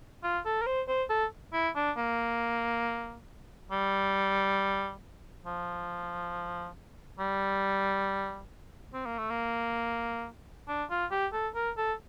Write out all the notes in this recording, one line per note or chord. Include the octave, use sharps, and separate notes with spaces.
F4
A4
A#4
C5
C5
A4
E4
D4
A#3
G3
F3
G3
C4
A#3
A3
A#3
D4
F4
G4
A4
A#4
A4